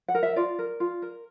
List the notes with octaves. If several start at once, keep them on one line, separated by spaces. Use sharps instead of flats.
F#5
A#4
E5
F4 D5
A#4
F4
A#4